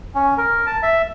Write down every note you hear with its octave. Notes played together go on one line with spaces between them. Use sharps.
C#4
A#4
A5
E5